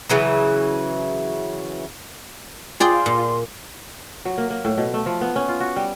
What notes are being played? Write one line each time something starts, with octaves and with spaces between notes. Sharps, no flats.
C#3 E3 F#3
F4 G#4 D5 G5 C6
A#2
F#3
A#3
A#3
A2
B2
A3
F3
B3
C#4
F4
F#4
G3